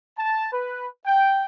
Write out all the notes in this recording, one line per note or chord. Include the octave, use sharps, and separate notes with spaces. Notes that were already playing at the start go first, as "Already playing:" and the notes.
A5
B4
G5